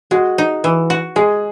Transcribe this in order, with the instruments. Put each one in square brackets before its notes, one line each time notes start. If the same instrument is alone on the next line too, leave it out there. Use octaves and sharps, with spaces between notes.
[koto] G#3 [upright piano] F#4
[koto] D#4
E3
F#4
[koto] G#3 [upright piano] G#4